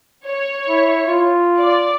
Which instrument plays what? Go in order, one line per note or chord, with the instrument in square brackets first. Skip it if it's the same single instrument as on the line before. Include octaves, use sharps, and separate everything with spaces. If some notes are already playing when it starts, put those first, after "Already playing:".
[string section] C#5
[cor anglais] E4
F4
[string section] D5